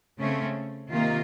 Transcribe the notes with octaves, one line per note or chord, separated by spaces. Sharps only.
C#3 A3 C4 C#4
C3 D#3 A#3 F4